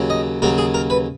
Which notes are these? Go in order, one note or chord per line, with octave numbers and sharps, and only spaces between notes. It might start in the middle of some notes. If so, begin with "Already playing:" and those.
Already playing: D#2 C#3 F#3
D#5
D#2 C#3 F#3 A#4
G#4
A#4
B4